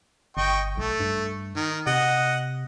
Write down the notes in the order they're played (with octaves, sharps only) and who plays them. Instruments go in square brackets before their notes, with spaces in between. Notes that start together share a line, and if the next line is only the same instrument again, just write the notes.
[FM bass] G1 [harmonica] D#5 G5 C#6
[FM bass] B1 [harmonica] A3
[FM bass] G2
[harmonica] D#3
[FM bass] C3 [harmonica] D#5 F#5